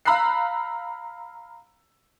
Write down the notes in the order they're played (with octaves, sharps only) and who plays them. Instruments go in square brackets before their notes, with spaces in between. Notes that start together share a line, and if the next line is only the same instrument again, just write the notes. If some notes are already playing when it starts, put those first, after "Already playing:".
[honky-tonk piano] F5 A#5 B5 E6 F#6 C7